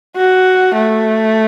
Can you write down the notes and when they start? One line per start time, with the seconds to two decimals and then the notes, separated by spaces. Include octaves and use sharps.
0.16 F#4
0.75 A3